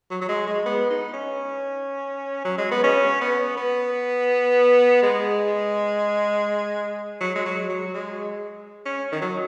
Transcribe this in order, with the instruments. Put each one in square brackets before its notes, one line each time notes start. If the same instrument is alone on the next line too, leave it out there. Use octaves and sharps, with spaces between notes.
[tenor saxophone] F#3
F#3
G#3
G#3
B3
D#4
C#4
F#3
G#3
B3
C#4
B3
B3
G#3
F#3
G#3
F#3
F#3
G#3
C#4
D#3
F#3